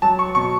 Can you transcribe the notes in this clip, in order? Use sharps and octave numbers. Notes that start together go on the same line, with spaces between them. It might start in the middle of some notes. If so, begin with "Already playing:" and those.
F#3 A5
C#6
B2 C#6